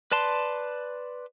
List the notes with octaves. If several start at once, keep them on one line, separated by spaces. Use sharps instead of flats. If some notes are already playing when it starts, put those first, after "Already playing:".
B4 D5 A5 C6